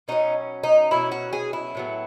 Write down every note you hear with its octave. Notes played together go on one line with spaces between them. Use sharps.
B2 F#3 C#4 D#4
D#4
B2 F#3 C#4 E4
F#4
G#4
E4
A2 F#3 B3